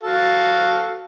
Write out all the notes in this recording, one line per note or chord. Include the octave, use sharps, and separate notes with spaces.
F#4 A4 F5